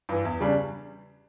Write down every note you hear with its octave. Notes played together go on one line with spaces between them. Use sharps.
G2 E3
E2
C#3 G3 D4